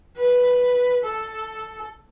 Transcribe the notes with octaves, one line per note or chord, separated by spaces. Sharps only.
B4
A4